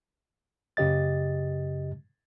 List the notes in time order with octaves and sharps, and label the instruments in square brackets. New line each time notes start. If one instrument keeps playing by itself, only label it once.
[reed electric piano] F#2 C#3 G4 D#5 A6